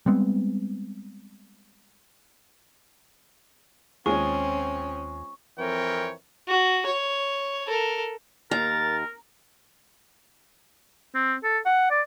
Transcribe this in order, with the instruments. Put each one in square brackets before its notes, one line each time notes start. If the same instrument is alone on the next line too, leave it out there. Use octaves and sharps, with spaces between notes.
[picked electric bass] G3 G#3 B3 C4
[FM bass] D#2 [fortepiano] G#3 F4 G#4 [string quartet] C4 C#4 [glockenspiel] C#6
[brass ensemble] F2 E3 C4 A#4 C#5 G5
[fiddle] F#4
C#5
A4 A#4
[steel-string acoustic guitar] D#2 [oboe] A#4 [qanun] A#5 [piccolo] A6
[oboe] C4
A4
F#5
D5